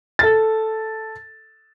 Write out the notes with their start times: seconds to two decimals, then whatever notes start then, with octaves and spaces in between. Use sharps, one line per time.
0.19 A4 A6